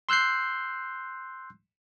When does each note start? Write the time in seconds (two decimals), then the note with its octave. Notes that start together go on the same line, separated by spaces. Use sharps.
0.09 C6 E6 F#6 G6 C7